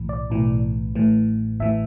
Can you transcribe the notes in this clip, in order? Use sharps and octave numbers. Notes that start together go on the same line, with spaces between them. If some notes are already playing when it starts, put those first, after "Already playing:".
Already playing: B1 A2 E3
D5
B1 A2 E3
A1 A2 E3
A1 A2 E3 E5